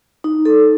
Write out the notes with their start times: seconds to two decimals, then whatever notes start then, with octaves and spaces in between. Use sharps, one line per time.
0.24 D#4
0.45 A4